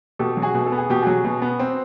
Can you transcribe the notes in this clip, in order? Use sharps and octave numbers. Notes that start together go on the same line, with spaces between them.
B2 G4 A4
F#3
F#4 G#4
B2
A4
B3
G#4
B2 G4
F#3 F#4 G#4
B2
B3
C4